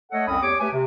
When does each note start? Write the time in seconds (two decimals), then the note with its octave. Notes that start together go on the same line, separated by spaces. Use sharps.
0.12 A3 A4 C#5 D#5 F#5
0.28 C2 F2 C4 C#4 B5 D#6
0.41 E2 G4 C#5 D6
0.60 A3 G4 B4 G#5
0.73 C3